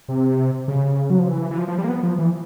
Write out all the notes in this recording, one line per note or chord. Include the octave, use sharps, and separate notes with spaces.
C3
C#3
F#3
F3
E3
E3
F3
F3
G3
A#3
B3
F3
E3